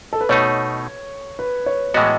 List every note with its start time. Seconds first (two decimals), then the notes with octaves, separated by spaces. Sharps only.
0.13 A4
0.21 B4
0.29 B2 A3 D#4 C#5
1.39 B4
1.66 C#5
1.94 A2 E3 G#3 B3 F#4 D#5